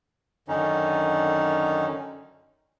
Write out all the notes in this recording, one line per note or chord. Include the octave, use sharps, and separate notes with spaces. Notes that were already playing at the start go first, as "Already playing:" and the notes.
F#2 D3 D#3 C#4 D#4